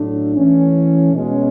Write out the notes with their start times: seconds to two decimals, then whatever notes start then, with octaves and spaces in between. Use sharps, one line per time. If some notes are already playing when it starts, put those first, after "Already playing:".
Already playing: A2 F#3 A3 D4
0.36 E3 A3 C#4
1.14 B2 G#3 C#4